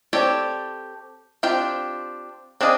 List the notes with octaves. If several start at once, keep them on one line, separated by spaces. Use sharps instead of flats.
C4 G4 A4 C#5 D5
C4 D4 F4 G4 G5
C4 D4 G#4 D#5 F5